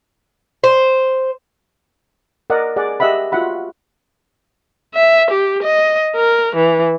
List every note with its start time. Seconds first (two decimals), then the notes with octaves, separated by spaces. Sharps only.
0.64 C5
2.50 A#4 D5 D#5 F#5
2.76 G#4 D5 F#5
3.00 G4 D#5 E5 F#5 B5
3.32 F4 F#4 E5 F#5 B5
4.95 E5
5.30 G4
5.63 D#5
6.16 A#4
6.56 E3